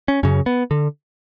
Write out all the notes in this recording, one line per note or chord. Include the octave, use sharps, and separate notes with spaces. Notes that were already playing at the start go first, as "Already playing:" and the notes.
C#4
F#2 C#3 C#4
B3
D3